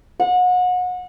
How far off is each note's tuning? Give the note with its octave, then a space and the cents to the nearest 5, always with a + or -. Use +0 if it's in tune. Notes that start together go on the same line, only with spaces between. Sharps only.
F#5 -30